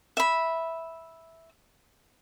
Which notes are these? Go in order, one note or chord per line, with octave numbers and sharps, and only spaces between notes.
E5 B5